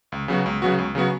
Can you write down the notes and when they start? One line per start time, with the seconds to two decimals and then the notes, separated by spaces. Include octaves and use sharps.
0.12 C#2
0.28 C#3 F#3 B3 F#4
0.46 C#2
0.62 C#3 F#3 B3 F#4
0.78 C#2
0.95 C#3 F#3 B3 F#4